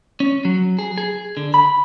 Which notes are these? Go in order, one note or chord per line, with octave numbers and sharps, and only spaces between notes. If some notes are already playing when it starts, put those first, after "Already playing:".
C#4
F#3
G#4
G#4
D3
B5